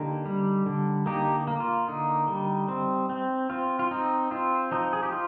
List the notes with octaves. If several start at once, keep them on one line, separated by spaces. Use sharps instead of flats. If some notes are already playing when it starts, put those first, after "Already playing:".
Already playing: D3 A#3 D#4 G4
G3
D3
A#3 D#4 G4
A#3
F4
D3 D#4
G3
C4
C4
C4 F4
F4
C4 D#4
C4 F4
F3 D#4
G#4
G4
F4